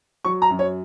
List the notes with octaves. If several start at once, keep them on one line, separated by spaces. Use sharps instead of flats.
F#3 C#6
A#5
F#2
C#5